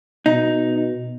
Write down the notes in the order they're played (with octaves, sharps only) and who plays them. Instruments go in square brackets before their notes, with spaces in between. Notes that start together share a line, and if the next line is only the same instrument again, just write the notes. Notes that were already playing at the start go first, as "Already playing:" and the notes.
[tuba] B2 [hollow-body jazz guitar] D#4